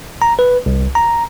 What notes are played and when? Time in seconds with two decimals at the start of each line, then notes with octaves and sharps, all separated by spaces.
0.22 A#5
0.39 B4
0.66 C2
0.95 A#5